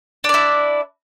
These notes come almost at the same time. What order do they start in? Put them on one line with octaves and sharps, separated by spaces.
D4 D5 E4